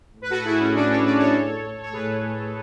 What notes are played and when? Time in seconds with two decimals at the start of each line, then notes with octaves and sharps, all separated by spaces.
0.15 A2
0.22 B4
0.30 F#4 A4
0.45 E4 G#4
0.60 C#4 E4
0.75 D4
0.89 A4 C#5
1.04 B4 D5
1.19 A4 C#5
1.82 C#5
1.93 A2 G#4 B4